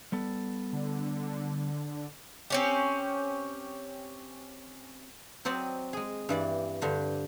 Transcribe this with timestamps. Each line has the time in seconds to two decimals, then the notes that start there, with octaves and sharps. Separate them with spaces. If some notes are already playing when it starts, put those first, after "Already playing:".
0.12 G3 B3 A4
0.73 D3
2.50 C4 C#4 G4
5.45 F#3 C4 C5 D5 D#5
5.93 G#3 G#4
6.29 G2 E3 D5
6.82 G2 D3 C5